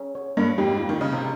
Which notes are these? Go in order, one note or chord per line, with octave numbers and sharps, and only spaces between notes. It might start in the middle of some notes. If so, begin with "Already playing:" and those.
Already playing: C#4
C#5
G2 A#3
F2 G#2 G4
F4
D#3
C#3 D#5
C3